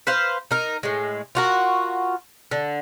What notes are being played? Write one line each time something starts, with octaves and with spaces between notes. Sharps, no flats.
B4 C5 F5
D#4 A#4
A2 G#3
F4 F#4 A#4
D3